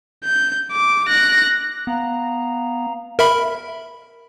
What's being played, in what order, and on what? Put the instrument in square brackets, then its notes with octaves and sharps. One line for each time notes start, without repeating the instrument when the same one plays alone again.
[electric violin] G6
D6
F#6 A#6
[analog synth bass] B3 [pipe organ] F5 A#5
[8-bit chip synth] A#4 E5 B5